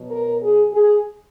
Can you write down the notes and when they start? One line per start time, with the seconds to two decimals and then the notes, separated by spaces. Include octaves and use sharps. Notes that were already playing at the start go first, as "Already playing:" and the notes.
Already playing: B2 F#3
0.11 A#4
0.42 G#4
0.72 G#4